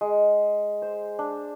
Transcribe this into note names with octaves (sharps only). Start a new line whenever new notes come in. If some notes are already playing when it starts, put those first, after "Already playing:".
G#3
C5
D4